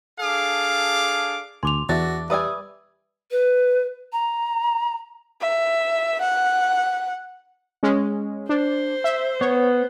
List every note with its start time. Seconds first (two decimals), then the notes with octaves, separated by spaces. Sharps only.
0.20 D4 G#4 A4 F5 D6
1.63 D2 G#5 C6 D6 F7
1.89 E2 D4 F#4 E5 A6
2.30 G3 B4 D5 E5 G#5 D#6 E6
3.31 B4
4.13 A#5
5.41 E5
6.22 F#5
7.83 G#3 C#4
8.49 D4 C5
9.04 E5
9.41 B3 C#5